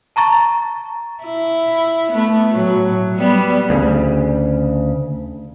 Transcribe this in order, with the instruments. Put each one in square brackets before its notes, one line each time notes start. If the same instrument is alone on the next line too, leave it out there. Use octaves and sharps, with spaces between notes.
[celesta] A5 A#5 C#6 A6
[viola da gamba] E4
A3 B3
A2 F#3
G3 B3
[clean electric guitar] D2 C#3